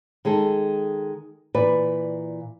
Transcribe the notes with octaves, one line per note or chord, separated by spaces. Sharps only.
D#3 G#3 G#4 A4
A#2 E3 B4 D5